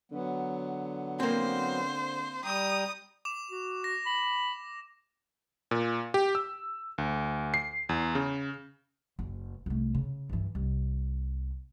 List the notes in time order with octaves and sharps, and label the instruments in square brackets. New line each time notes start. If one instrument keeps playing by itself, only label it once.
[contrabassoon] D3 [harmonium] F#3 B3
[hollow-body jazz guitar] A#3 C4 [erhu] C5
[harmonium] G3 G5 A#5 [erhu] D#6
[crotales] D6 E7
[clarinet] F#4
[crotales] A#6
[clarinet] B5
[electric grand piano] A#2
G4
E6
D2
C7
E2
C#3
[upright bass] F#1
C2 A3
C#3
G2 E3
C2